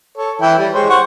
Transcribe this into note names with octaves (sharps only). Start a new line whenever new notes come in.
A4 C#5
E3 E4 G5
G3
G#3 C5 C#5
C5 F#5 C#6